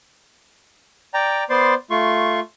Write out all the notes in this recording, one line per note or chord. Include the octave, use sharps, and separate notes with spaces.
D5 G5 A#5
B3 C5 D5 C6
A3 F4 C6 C#6